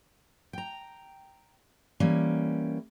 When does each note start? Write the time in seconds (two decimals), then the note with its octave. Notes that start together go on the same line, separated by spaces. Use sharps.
0.53 G5 A#5
2.00 E3 G3 A#3 C#4